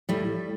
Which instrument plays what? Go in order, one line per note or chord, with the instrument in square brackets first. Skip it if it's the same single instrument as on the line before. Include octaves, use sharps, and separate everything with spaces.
[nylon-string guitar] A2 G3